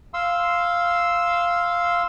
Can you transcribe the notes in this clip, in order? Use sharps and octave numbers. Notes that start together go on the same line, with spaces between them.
F5 C6 E6